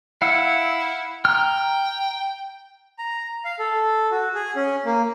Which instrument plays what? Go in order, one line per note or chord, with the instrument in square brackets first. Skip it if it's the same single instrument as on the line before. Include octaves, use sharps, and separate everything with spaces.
[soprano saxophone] E4 [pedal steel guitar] F5 F#5 E6
[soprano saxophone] G5 [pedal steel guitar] A#5 F6
[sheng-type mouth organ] A#5
F5
A4
F#4
G#4
C#4
A#3